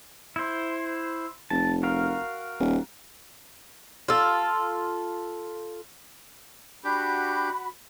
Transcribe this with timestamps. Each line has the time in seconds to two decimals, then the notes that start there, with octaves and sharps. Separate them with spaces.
0.36 E4 C5
1.50 F1 A5
1.83 F#4 A#4 F5
2.60 D#1
4.08 F4 A4
6.84 D4 F#4 G4 B5